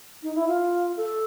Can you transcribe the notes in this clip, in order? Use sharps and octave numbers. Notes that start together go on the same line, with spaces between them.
D#4
E4
F4
A4